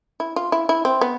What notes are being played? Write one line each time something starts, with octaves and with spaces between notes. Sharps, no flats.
E4
F4
E4
E4
C4
B3